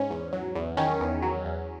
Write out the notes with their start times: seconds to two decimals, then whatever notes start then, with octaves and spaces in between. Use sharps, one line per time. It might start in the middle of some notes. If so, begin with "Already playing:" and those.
Already playing: G#2 C#4
0.10 E2
0.33 F#3
0.55 E2
0.77 D#3 C#4
1.00 E2
1.22 F#3
1.45 E2